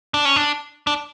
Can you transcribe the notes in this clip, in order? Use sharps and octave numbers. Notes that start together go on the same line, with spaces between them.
D4
C#4
D4
D4